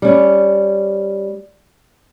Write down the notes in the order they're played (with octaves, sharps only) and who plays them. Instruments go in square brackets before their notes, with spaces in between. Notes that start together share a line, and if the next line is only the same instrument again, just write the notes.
[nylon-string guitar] G3 C#4